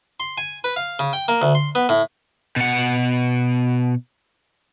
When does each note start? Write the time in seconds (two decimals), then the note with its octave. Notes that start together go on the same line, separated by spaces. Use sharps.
0.20 C6
0.38 G#5
0.64 B4
0.76 F5
0.99 C#3
1.13 G5
1.28 A#3
1.42 D2
1.55 C6
1.75 B3
1.89 A2
2.56 B2 F#5